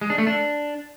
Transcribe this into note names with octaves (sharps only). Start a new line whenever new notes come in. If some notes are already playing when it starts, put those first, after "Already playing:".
G#3
D4
A3
D4